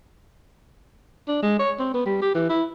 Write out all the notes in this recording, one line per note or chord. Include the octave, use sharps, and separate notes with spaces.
D4
G#3
C#5
C4
B3
G3
G4
E3
E4